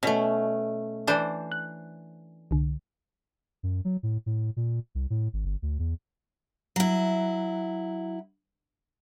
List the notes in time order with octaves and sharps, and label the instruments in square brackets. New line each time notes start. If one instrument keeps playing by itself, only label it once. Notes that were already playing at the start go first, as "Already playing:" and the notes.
[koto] B2 [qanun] A3 C#4
[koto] E3 D4 C5
[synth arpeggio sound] F#6
C2 D3
[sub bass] F#2
F#3
A2
A2
A#2
C2
A2
G#1
G1
D2
E2
[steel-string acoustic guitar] F#3 E4